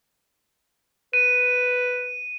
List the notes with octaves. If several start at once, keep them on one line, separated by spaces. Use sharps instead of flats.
B4 D#7